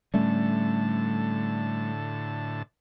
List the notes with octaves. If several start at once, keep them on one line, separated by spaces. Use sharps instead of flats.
A2 D3 G3 A3 C#4 A5